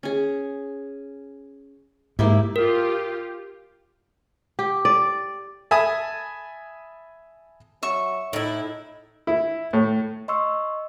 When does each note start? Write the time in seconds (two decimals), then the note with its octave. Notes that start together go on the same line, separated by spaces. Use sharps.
0.03 C#4 G#4
2.19 G#2 A#3 E4 G4
2.56 F4 G4 A#4
4.59 G4
4.85 D5
5.71 E5 G#5 A5 B5 D#6
7.83 F#3 E5 C#6
8.33 A2 D#4 E4
9.27 E4
9.73 A2
10.28 D#5 C6 C#6 E6